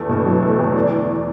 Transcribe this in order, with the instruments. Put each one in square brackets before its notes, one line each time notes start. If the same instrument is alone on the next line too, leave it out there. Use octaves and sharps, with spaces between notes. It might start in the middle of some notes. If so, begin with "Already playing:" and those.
Already playing: [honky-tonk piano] E2 D3 A3
B2
F#3
A3
E2
D5